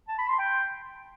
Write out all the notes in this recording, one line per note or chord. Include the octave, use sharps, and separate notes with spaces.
A5
B5
C6
G5